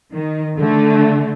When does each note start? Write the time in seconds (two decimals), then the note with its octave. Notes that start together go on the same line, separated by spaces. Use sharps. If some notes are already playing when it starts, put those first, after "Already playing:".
0.12 D#3
0.57 D3 A3